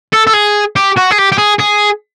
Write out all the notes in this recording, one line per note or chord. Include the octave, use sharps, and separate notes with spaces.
A4
A4
G#4
G4
F#4
G#4
G4
G4
G#4
G#4